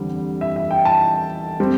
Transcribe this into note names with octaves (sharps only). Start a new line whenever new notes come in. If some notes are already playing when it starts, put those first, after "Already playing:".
Already playing: E2 D3 G3 C4
E5
E5
G5
A5
G3 C4